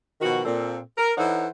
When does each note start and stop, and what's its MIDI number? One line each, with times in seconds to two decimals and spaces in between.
0.21 0.44 47
0.21 0.44 51
0.21 0.44 53
0.21 0.44 66
0.45 0.79 46
0.45 0.79 60
0.45 0.79 69
0.97 1.13 70
1.18 1.47 52
1.18 1.47 63
1.18 1.47 69
1.18 1.47 72
1.18 1.47 73
1.18 1.47 78